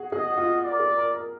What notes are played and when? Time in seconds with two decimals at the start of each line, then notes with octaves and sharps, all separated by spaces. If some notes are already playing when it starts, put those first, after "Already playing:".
Already playing: F#4 G#4
0.12 G#4 D#5
0.32 F#4
0.37 F4
0.63 D5
0.71 A#4
0.80 G#4
0.97 A#4
1.15 A#4